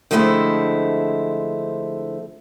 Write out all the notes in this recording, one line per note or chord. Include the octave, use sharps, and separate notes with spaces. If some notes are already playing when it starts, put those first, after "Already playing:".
D3 F3 G#3 A3 C4 E4